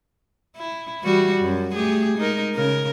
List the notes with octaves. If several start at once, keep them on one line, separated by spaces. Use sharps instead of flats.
E4
E3 G3 F#4
F#2
A3 G4 G#4
G#3 D#4 A#4
C#3 A#4